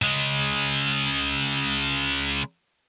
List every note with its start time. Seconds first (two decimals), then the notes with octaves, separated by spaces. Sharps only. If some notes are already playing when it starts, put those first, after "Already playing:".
0.02 C#3 G#3